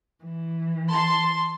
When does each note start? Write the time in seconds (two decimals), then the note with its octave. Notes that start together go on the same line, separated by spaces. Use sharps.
0.23 E3
0.92 A5 C6